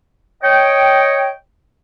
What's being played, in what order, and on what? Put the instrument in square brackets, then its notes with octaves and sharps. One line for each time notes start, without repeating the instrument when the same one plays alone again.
[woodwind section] C#5 D#5 G5